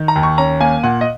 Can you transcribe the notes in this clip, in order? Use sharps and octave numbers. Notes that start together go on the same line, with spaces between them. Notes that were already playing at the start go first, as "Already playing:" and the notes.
Already playing: D#3
A#5
D#2
C#6
C#4 A#5
A#3 G#5
A#2 F#5
D#5